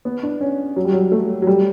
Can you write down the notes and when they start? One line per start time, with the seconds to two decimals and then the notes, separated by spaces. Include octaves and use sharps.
0.05 B3
0.23 D4
0.41 C#4
0.76 F#3
0.85 G3
0.92 F#3
1.12 A3
1.42 F#3
1.47 G3